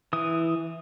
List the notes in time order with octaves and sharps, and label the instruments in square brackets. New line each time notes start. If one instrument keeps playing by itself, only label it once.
[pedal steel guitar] E3 D#6